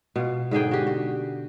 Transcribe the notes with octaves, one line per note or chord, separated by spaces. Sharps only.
B2 F4
G#2 D3 G#4 G5
F#4 G4
F#4